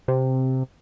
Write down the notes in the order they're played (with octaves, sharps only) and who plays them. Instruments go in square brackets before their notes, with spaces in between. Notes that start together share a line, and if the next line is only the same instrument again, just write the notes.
[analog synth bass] C3